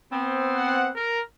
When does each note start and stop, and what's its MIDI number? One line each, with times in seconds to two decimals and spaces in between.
0.12 0.89 59
0.12 0.89 60
0.55 0.88 78
0.95 1.20 70